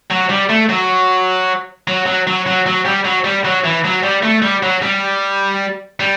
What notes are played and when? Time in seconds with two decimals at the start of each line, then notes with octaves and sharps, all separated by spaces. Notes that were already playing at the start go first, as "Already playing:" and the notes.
0.11 F#3
0.30 G3
0.50 A3
0.69 F#3
1.88 F#3
2.06 F#3
2.27 F#3
2.47 F#3
2.66 F#3
2.86 G3
3.05 F#3
3.24 G3
3.44 F#3
3.64 E3
3.84 F#3
4.03 G3
4.22 A3
4.42 G3
4.63 F#3
4.82 G3
6.00 G3